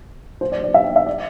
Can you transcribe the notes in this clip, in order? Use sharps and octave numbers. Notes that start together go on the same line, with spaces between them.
C5
D5
D5
E5
G5
E5
D5